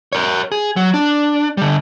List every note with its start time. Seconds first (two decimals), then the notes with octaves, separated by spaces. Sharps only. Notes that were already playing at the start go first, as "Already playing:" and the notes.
0.13 A#4 C#5
0.52 G#4
0.76 F#3
0.94 D4
1.57 D3 G3